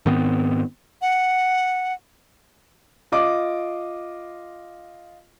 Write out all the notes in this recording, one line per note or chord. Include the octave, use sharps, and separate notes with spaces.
G#2 D#3 B3 C4
F#5
F4 D#5 D6